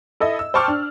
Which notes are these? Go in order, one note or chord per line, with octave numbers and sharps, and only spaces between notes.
E4 A4 D#5 E5
E6
C5 G5 A5 C#6 D6 F6
D4